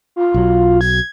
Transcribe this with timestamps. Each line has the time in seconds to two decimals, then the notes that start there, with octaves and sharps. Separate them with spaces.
0.16 F4
0.34 B1 F#3
0.81 G#6